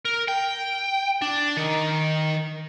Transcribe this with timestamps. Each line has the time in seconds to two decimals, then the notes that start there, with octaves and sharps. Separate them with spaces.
0.05 A#4
0.28 G5
1.22 D4
1.57 D#3